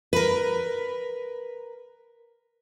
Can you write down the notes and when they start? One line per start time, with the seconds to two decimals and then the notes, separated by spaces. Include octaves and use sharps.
0.13 A#4 B4